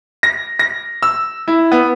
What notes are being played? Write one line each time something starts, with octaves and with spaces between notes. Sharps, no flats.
A#6
A#6
E6
E4
B3